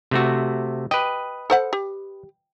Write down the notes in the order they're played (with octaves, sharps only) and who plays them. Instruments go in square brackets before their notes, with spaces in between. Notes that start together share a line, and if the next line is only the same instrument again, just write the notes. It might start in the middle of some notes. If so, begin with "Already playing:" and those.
[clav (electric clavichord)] C3 A3 F#4
[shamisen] G4 [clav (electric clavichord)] B4 D#5
[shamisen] A4 C5 F#5
G4